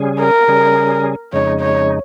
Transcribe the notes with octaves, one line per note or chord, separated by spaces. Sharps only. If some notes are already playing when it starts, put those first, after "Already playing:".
Already playing: C#3 G3 C#4 G#4
A#4
C#3 G3 C#4 G#4
F2 C#3 G#3 D#4 C#5
C#5